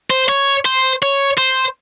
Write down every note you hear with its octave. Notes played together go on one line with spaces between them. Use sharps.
C5
C#5
C5
C#5
C5